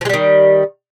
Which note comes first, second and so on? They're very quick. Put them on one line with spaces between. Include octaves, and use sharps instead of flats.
F3 G#3 G3 D#3